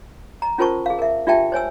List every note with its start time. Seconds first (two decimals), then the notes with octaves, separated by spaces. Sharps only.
0.42 A#5
0.58 C#4 F4 A#4 C5 A5 C#6
0.86 G#4 F5
0.99 A#4 E5
1.27 D4 F4 G4 E5 G5 A5
1.52 C5 C#5 G#5 E6